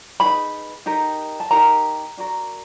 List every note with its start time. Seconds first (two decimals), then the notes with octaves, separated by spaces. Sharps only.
0.20 D#4 G#4 B4 B5
0.86 D#4 G4 A#4
1.40 A5
1.51 D#4 G4 A#4 A#5
2.17 D4 F#4 A#4